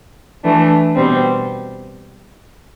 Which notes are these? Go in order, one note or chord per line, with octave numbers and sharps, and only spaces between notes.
E3 A3 D4
B2 G3 C4